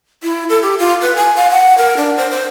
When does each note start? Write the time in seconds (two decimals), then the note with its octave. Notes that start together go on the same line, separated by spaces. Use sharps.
0.23 E4
0.49 A4
0.63 G4
0.79 F4
1.01 B4
1.16 G#5
1.36 F5
1.51 F#5
1.78 A#4
1.97 D4
2.17 C5
2.31 C5